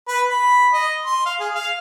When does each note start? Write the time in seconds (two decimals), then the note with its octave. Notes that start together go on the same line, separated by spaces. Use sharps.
0.08 B4
0.30 B5
0.74 D#5
1.05 C6
1.26 F5
1.40 G#4
1.55 F5